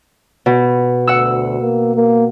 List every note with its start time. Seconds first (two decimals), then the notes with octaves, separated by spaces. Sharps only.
0.46 B2
1.07 D2 F#5 E6
1.61 A#3
1.95 A#3